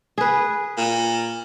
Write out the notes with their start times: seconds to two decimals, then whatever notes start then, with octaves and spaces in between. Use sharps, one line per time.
0.18 G#4 B4
0.78 A#2